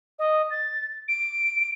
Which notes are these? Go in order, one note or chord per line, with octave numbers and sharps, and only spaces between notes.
D#5
A6
D7